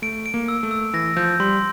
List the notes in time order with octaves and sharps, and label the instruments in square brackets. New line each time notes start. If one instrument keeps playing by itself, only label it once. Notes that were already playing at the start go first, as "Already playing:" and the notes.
[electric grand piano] A3 [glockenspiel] D7
[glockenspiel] D7
[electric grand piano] A#3
[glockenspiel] E6
[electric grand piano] A3
[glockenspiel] E6
[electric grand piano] E3 [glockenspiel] A#6
[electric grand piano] F3 [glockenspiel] G6
[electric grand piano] G3 [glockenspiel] C6